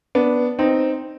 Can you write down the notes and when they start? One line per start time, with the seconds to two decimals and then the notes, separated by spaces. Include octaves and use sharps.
0.15 B3 D4
0.59 C4 D#4